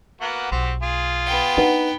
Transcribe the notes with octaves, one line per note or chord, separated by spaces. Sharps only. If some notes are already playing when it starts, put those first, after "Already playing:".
A#3 B3 F#4
B1 C4 F#4 G4
F4 G#4
B3 G5
D4 D#4 B4 F#5